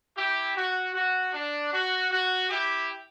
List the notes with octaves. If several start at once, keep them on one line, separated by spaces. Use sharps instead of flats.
E4 G4
F#4
F#4
D4
F#4
F#4
E4 G4